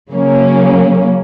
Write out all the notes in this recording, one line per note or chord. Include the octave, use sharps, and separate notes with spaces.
C#3 F#3 A#3 C#4